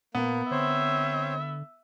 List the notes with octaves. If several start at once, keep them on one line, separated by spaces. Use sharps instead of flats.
A#2 A#3 B3
D3 C4 C5 C#5 E5